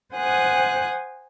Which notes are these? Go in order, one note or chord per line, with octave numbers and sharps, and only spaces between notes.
C5 F#5 G#5 D#6 F#6